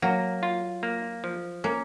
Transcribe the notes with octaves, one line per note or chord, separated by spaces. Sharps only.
F#3 A#3
F4
A#3
F3
A#3 C#4